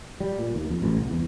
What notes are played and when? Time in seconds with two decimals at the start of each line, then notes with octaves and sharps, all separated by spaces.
0.20 G3
0.38 A#2
0.55 D#2
0.70 F2
0.82 A1
0.97 C2
1.10 E2